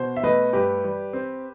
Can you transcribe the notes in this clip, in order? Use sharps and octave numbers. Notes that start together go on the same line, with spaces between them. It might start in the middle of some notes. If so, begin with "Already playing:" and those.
Already playing: B2 C5
E5
A3 B4 D#5
G2 G4 B4
G3
C4